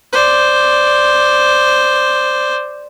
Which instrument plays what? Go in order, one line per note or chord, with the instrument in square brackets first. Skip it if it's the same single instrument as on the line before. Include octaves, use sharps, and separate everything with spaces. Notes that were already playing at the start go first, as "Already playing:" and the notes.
[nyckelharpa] C5 D5